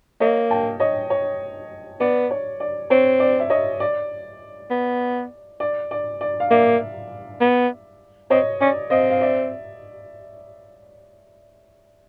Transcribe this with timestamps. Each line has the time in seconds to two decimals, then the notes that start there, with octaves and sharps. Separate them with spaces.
0.20 A#3 C#5 D#5
0.51 G5 A5
0.80 C#5 D#5
1.10 C#5
2.00 B3 D5
2.31 C#5
2.60 D5
2.90 C4 C#5
3.20 D5
3.39 E5
3.50 C#5 D#5
3.80 D5
4.70 B3
5.60 D5
5.91 D5
6.21 D5
6.40 F5
6.50 A#3 D5 E5
7.41 B3
8.30 C4 C#5 D#5
8.61 C#4 D5
8.90 C4 D#5 F5
9.11 F5
9.21 D5 E5